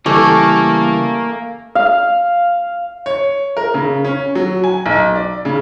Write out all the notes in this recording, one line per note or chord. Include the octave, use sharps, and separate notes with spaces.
C#3 E3 G3 A3 A#3 G#5 C#6 D6
F5
C#5
A#4
C#3
C#4
F#3
G#5
B1
D5
C#3